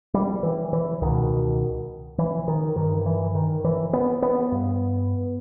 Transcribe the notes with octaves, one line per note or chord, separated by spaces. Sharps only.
G3
E3
E3
C#2 B2 D#3
E3
D#3
G2 D#3
E3
D#3
E3
B3
B3
G2